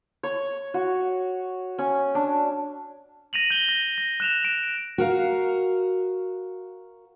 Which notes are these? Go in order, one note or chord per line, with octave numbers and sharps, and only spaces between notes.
C#5
F#4
C#4
D4
A#6 D#7 F7 F#7
G6 A#6 G7
A#6
A#6
F#6 E7 F7
D7
F#4 A#4 F5